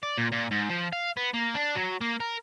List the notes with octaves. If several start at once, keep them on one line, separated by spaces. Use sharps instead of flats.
D5
A#2
A#2
G#2
F3
F5
B3
A#3
D4
F#3
A#3
A#4